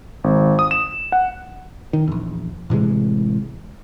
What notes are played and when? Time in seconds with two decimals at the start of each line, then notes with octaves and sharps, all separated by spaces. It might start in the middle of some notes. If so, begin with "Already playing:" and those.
0.24 G#1
0.59 D#6
0.71 E7
1.12 F#5
1.93 D#3
2.07 A#1 E2
2.70 A2 C3 E3 G#3